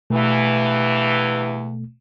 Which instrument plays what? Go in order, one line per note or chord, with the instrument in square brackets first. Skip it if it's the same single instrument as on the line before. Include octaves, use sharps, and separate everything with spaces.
[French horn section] E2 G2 E3 [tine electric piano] B2 A3